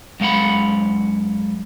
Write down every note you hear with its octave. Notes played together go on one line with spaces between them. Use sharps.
F#2 G#3 F5 F#5 B5